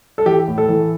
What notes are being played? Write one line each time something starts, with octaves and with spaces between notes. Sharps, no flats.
A4
E3 G4
A2
A4
E3